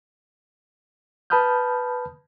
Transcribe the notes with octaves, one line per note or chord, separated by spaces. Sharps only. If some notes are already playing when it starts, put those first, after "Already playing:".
B4 A5 B5 D#6 F6 G6